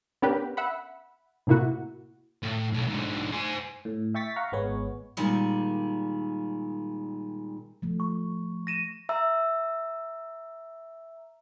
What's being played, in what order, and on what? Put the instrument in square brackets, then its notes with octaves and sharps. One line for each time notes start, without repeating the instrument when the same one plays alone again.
[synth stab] B3 C#4 D4 G4 A#4 B4
E5 F#5 B5
A2 C3 A#3 E4 F#4
[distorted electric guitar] A2
B1
G#2 D3
C5 G#5
[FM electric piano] A2
E5 G5 C#6 A6 B6
F5 F#5 A#5 C#6
G#1 G#3 B3 C#5
[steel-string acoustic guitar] A#2 D#3 G3 G#3
[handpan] F3 A3
[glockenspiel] C#6
A#6 D#7 E7
[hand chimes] E5 A#5 E6